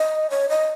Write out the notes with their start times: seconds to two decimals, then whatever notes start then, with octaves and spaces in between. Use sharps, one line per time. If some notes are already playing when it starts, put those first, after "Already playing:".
Already playing: D#5
0.30 C#5
0.49 D#5